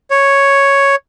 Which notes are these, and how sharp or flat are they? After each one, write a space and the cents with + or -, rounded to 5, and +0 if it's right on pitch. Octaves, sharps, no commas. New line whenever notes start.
C#5 +0